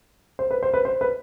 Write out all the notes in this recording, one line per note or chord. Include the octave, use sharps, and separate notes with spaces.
C5
B4
C5
B4
C5
B4